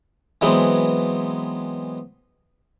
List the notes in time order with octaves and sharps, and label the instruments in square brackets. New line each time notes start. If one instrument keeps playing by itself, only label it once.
[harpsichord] E3 F#3 G#3 B3 C4